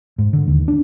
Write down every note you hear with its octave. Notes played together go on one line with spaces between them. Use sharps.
G#2
D3
D#2
D4